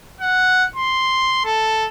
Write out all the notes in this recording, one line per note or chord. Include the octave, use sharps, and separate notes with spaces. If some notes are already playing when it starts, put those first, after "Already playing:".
F#5
C6
A4